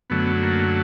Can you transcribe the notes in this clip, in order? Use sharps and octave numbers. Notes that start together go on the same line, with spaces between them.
F#2 D3 F#3 A3 B3
A#3